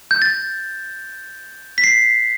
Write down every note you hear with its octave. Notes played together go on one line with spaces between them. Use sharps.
G6
A6
B6
C7